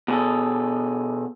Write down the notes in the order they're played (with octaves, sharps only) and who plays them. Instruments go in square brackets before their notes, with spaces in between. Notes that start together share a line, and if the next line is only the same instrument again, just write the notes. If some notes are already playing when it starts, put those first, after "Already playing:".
[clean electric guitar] B2 G#4 A4